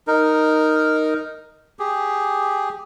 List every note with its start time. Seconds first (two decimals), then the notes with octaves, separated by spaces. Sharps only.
0.07 D#4 A#4
1.79 G4 G#4